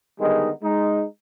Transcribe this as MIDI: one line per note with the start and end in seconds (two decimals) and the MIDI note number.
0.20 0.50 50
0.20 0.50 51
0.20 0.50 55
0.20 0.50 56
0.20 0.50 59
0.20 0.50 63
0.63 1.04 56
0.63 1.04 63